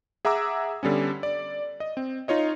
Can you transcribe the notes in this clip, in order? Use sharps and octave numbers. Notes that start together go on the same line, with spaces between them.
G#4 E5 F#5 A#5 D6 E6
D3 G3 B3 C#4
D5
D#5
C4
D#4 F4 C#5 D#5